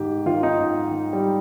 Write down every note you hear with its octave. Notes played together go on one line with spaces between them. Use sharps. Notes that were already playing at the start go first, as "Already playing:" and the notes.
Already playing: G#2 D#3 G4
D#3 F4
D#4
G#2
D#3
G3